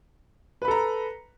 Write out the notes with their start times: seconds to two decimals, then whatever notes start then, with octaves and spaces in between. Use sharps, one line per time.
0.62 B4
0.65 B5
0.68 A4
0.71 A#5